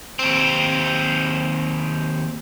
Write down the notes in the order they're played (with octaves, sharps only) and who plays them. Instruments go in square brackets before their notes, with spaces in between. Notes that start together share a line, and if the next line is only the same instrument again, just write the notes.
[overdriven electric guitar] D#2 C4